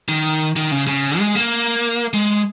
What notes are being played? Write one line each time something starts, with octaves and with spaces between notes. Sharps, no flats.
D#3
D#3
C#3
C#3
G#3
A#3
G#3